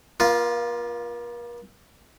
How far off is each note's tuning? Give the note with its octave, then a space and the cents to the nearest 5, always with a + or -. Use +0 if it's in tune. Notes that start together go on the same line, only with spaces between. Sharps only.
A#3 +40 F4 +0